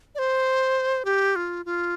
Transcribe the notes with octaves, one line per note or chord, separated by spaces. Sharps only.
D5
C5
G4
F4
F4